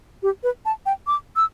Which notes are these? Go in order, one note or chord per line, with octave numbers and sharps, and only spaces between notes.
G4
B4
A5
G5
D6
E6